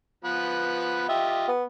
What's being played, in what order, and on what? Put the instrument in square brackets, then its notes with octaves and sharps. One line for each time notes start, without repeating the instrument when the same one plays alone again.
[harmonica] F3 B3 B4
[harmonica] F4 G4 D#5 [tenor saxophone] E5
[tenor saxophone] B3